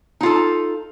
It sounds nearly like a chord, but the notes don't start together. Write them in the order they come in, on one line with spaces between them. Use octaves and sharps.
D#4 F4 A4